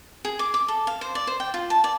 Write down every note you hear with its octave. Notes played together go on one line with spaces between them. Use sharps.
G#4
D6
D6
A4
F5
C5
D5
C5
G5
F4
A5
D5